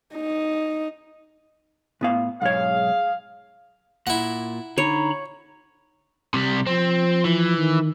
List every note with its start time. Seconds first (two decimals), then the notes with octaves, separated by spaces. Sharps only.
0.14 D#4
2.01 A2 B3 F5
2.42 B1 G#2 G#4 C#5 F5
4.07 A#2 E4 F#5
4.78 D3 D#4 C#5 A#5 B5
6.34 C3 G3
6.67 F3 C4
7.25 E3
7.58 D#3